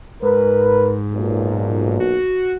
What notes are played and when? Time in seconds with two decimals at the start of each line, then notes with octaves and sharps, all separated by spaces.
0.22 G#2 A#4 B4
1.13 B1 A#2
2.00 F#4